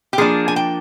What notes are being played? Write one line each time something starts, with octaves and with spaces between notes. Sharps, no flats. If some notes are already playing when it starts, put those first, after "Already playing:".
G4
F3 A#3 D4 G#4
G#5
G5